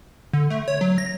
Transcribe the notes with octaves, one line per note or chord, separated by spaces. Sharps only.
D3
A3
C#5
F#3
A#6